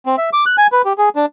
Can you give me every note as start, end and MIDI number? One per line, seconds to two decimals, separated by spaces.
0.06 0.16 60
0.18 0.30 76
0.33 0.45 86
0.46 0.56 90
0.58 0.67 80
0.72 0.82 71
0.85 0.93 67
0.98 1.09 68
1.16 1.26 62